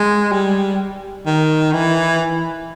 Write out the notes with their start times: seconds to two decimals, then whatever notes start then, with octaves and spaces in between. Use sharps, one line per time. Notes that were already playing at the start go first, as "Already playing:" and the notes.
Already playing: G#3
0.32 G3
1.26 D#3
1.73 E3